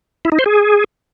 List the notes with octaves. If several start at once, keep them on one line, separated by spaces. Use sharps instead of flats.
E4
D#4
C5
G#4